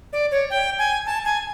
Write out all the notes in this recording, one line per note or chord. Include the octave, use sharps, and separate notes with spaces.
D5
C#5
G5
G#5
A5
G#5